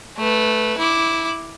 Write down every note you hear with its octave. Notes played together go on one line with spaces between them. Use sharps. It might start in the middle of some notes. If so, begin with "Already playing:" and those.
A3 B4
E4 D6